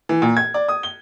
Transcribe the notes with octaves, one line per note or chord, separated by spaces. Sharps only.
E3
A#2
G#6
D5
D#6
G7